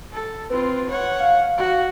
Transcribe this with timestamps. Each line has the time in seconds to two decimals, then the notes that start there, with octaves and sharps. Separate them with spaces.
0.13 A4
0.50 C4 F4 B4
0.90 C#5 F#5
1.19 F5
1.58 F#4